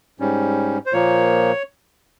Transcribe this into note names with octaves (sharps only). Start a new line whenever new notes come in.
G#2 G3 C#4
C5
A#2 F3 A#3 C#5